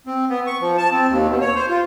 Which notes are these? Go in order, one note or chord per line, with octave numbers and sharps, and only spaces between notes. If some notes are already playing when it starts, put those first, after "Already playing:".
C4
B3
C#6
F3
A5
C4
D#2
B2
C#5
C5
F4